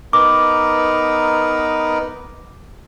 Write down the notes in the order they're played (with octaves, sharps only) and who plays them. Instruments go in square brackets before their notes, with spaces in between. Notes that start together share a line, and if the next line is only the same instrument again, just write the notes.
[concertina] B3 D#4 A#4 [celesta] D6